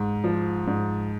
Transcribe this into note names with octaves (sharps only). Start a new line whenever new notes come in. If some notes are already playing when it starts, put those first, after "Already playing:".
Already playing: G#2
F3
G#2